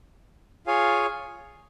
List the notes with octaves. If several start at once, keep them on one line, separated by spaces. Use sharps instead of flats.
F4 G#4 C#5 F5 G#5